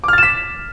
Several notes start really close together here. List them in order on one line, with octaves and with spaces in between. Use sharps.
D6 F6 A6 E7 B6